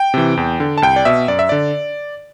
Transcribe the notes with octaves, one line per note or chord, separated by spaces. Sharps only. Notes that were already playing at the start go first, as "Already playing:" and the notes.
Already playing: G5
C3 E3
E2
D3
A5
C2 G5
D5
B2 E5
F#2 D5
E5
D3 D5